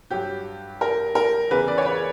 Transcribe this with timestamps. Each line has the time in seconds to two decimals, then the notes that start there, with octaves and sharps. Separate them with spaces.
0.11 G2 F#3 G4
0.81 A#4
1.15 A#4
1.50 E2 C#3 E3 B4
1.68 D5
1.78 C#5
1.86 B4